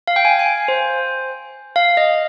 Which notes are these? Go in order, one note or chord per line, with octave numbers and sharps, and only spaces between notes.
F5
G5
G#5
G#5
C5
F5
D#5